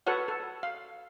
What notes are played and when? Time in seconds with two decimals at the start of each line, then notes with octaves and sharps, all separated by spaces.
0.06 F#4 A4 B4 C#5 F#5
0.28 A4
0.63 F5